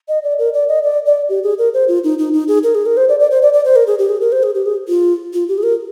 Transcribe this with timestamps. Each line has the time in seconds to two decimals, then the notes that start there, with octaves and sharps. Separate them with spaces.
0.08 D#5
0.23 D5
0.39 A#4
0.54 D5
0.68 D#5
0.83 D5
1.06 D5
1.29 G4
1.43 G#4
1.58 A#4
1.74 C5
1.88 F4
2.04 D#4
2.18 D#4
2.33 D#4
2.48 G#4
2.63 A#4
2.75 G#4
2.86 A#4
2.97 C5
3.09 D5
3.19 D5
3.31 C5
3.42 D5
3.53 D5
3.65 C5
3.76 A#4
3.87 G#4
3.99 G4
4.09 G#4
4.21 A#4
4.32 C5
4.43 G#4
4.54 G4
4.66 G#4
4.88 F4
5.33 F4
5.48 G4
5.58 G#4
5.63 A#4